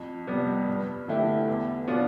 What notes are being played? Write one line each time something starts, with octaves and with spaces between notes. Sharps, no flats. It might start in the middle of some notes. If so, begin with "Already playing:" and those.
Already playing: F2
C3 G3 B3
G2
D3 A3 E4 G4
E2
B2 B3 D4 F4